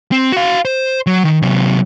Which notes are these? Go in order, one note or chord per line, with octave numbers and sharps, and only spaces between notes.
C4
F#4 F5
C5
F#3
D#3
C3 F#3